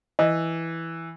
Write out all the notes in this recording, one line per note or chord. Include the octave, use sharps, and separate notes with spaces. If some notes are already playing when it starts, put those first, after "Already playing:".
E3 D#5